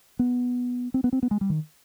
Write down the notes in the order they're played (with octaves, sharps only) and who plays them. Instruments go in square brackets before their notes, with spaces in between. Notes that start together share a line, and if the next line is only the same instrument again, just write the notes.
[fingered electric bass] B3
C4
B3
C4
B3
G#3
G3
D#3